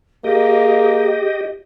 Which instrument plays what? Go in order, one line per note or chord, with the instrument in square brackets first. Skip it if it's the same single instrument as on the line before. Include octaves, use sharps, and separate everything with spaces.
[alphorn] A#3 [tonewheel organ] G4 D#5 [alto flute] G#4